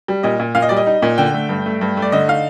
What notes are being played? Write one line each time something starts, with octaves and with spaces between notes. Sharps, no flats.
G3
A#2 D#5
A#2
A#2 F5
D#5
G3 D5
D#5
D#4
A#2
D3 G5
A3
G2
A3
G2
A3
D5
D3 D#5
D#4 F5